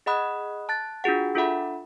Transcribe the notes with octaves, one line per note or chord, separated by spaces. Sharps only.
G#4 D#5 F#5 B5 D#6 F#6
A5 F#6 A6
D4 F4 F#4 G#4 F#5
D4 F4 A4 E5 F#5 B5